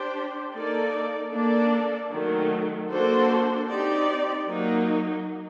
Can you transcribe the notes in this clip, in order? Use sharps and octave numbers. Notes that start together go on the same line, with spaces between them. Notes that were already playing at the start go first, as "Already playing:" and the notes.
Already playing: D4 G4 C5
A#3 D#4 A4 D5
A#3 D4 A4 D5
D#3 F#3 A3
A#3 D4 F#4 A4 C5
C4 D#4 G4 D5
F#3 A#3 D#4